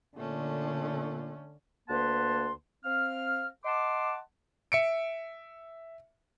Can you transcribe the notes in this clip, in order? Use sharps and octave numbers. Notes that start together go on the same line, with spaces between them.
A#2 D3 A3 C#4
D2 A#3 B4 F#5 A5 C6
C4 F5 F6
D#5 F#5 A5 C6 D6
E5 C#7 D7